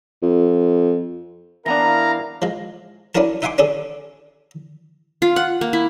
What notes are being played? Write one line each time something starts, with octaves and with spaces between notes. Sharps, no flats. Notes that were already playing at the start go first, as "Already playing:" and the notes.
F2
E3 B3 D4 E4 A#4 F5 A#5
F3 G#3
C#4 D4 E4 F#4 A#4 A5
D#4 E5 F#5 G#5 C6 D6
C#4 D4 G#4 A4
F4
F#5
A#3
E4